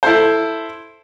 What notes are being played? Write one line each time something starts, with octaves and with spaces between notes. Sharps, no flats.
E4 A4 C5